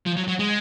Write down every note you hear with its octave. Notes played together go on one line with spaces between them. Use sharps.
F3
F#3
F#3
G#3